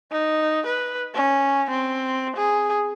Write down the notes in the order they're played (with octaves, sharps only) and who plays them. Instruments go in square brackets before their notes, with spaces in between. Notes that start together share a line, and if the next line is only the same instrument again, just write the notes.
[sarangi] D#4
B4
C#4
C4
G#4